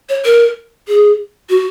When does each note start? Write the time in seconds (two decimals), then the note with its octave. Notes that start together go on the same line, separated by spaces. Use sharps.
0.09 C#5
0.25 A#4
0.88 G#4
1.50 F#4